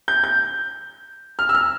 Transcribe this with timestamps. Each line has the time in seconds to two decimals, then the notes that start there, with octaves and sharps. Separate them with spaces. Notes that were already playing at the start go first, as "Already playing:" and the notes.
0.08 G6
0.24 G6
1.39 F6
1.49 E6
1.55 F6